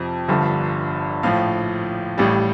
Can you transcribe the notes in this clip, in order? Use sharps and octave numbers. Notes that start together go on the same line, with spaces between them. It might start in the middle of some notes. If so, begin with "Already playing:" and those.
Already playing: F2 C3 F3
G1 G2 D3 F3
A#1 A2 F3 F5
A1 A2 G3